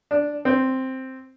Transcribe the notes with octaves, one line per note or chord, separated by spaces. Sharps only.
D4
C4